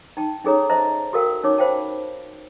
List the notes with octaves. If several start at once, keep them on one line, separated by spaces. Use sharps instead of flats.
D#4 G5 A5
C#4 D#4 G#4 A4 C#5 A#5
C5 D#5 E5 A5 A#5
F#4 A4 A#4 F5 G5
C#4 D#4 C#5 D6
F4 C5 F5 G5 A5